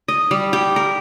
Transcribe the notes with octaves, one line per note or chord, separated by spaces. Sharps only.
D#5
G3
G4
A#4